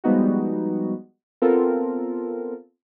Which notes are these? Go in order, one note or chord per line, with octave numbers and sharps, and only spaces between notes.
F3 G3 G#3 B3 D#4 F#4
B3 C4 F4 A4 A#4